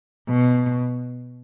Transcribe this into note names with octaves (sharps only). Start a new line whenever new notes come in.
B2